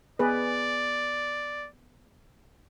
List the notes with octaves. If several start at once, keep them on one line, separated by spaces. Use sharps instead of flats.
B3 G#4 B4 D5